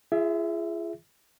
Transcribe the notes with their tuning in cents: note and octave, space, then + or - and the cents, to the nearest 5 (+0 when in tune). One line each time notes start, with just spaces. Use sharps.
F4 -45 G#4 +0 E5 +0